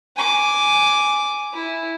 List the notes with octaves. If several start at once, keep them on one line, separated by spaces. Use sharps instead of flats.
G#5 D6
E4